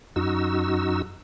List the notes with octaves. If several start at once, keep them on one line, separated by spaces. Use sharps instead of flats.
F#2 D#4 F#4 E6